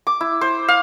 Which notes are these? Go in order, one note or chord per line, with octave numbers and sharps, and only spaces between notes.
D6
E4
C5
F5